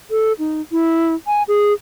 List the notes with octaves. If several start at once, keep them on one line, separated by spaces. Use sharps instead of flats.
A4
D#4
E4
G#5
G#4